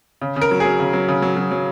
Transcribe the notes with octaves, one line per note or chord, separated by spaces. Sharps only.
C#3
C#3
A#4
F#3
G#4
F#3
C#3
F#3
C#3
F#3
F#3
F#3